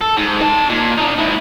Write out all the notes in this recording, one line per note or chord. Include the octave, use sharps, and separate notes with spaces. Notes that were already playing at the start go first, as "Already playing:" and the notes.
A4
G#2
D#4 A5
A#2
D4 D#4
G#2 E4